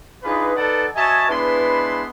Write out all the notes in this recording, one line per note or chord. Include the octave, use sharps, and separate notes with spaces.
D4 D#4 F4 G#4 B4
D#4 A4 B4 D5 F#5 A5
F#4 C#5 D#5 E5 G#5 A5
G#3 B3 D4 E4 B4 C6